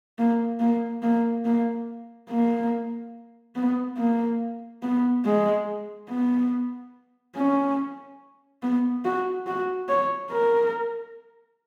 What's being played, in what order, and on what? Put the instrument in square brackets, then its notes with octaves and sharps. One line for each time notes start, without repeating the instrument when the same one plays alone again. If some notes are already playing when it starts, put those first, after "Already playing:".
[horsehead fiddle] A#3
A#3
A#3
A#3
A#3
B3
A#3
B3
G#3
B3
C#4
B3
F#4
F#4
C#5
A#4